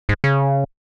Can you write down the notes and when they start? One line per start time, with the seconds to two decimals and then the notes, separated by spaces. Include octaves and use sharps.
0.09 G#2
0.24 C#3